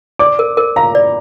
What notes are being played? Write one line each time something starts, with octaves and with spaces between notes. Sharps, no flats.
D5 D6
A#4
A#4
F5 A#5
D5